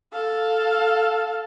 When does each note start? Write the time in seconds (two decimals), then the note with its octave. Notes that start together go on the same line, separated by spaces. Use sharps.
0.13 A4 F5